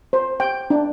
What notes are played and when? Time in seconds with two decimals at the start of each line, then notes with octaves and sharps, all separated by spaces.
0.13 C5
0.40 G5
0.70 D4